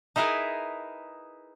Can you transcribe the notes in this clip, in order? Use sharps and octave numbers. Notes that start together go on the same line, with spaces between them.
D#4 E4 G#4 A#4 B4